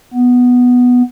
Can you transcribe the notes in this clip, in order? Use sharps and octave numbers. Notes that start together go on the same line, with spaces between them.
B3